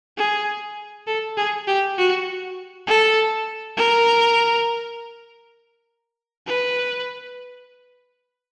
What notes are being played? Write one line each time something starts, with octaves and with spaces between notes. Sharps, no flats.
G#4
A4
G#4
G4
F#4
A4
A#4
B4